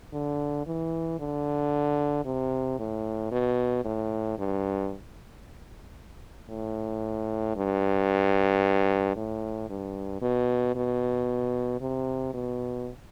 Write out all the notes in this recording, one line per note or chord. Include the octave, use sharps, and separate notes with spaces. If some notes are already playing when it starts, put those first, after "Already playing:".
D3
E3
D3
C3
A2
B2
A2
G2
A2
G2
A2
G2
B2
B2
C3
B2